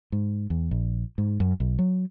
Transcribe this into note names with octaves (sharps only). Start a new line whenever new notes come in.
G#2
E2
A#1
G#2
F#2
B1
F#3